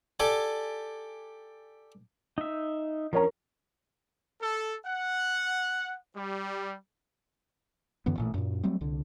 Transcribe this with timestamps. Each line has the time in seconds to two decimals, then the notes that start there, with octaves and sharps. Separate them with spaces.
0.20 G4 A4 D5 G#5
2.38 D#4 E5
3.13 F3 C#4 A#4 C#5 A#5
4.41 A4
4.86 F#5
6.15 G3
8.06 F#2 D3 E3 B3
8.18 A1 A#2 A3
8.34 F#2 A#2
8.64 F#3 G3 A3 C4
8.81 C2 D3